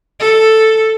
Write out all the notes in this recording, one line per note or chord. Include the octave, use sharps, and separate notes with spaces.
A4